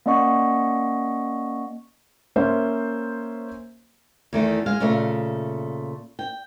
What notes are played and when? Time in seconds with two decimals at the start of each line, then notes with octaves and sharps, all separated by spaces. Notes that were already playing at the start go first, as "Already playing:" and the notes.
0.06 A#3 C#4 D5 D#5 F#5 C#6
2.36 A#3 C#4 C5 E5
4.33 E2 D#3 A3
4.66 G#3 F5
4.80 A#2 C#3 A3
6.19 G5